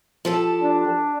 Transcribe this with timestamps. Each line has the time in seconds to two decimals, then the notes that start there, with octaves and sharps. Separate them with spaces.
0.25 F3 G4 A4
0.62 D4